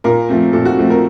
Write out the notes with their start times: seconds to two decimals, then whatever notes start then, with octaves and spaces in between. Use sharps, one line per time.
0.04 A#2 A#4
0.29 F3 A3 C4
0.53 A#2 A4
0.65 F#4
0.78 F3 A3 C4
0.90 A#4